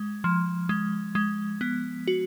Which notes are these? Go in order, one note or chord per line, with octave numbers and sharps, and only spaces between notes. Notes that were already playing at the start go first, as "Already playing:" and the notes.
Already playing: G#3
F3
G#3
G#3
B3
F#4